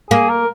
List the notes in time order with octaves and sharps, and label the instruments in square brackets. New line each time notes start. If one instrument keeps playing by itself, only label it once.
[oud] A#3 [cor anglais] G#4
[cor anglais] A#4